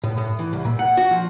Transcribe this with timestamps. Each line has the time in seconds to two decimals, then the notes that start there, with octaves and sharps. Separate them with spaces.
0.04 A2
0.18 A2
0.39 E3
0.53 C2
0.65 A#2
0.79 F#5
0.97 F#4
1.11 F3